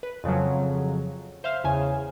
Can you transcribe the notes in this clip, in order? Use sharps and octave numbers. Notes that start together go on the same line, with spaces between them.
B4
F2 C#3 F3 F#3
C5 E5 F5 F6
E2 C#3 G#5